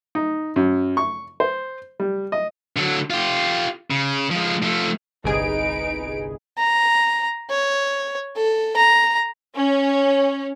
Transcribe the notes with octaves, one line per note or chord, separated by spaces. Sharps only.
D#4
F#2
C#6
C5
G3
D#5
D3 F#3
F4 G4
C#3
F3 G#3
F3 A3
G1 C2 D#4 G#4 B4 D7
A#5
C#5
A4
A#5
C#4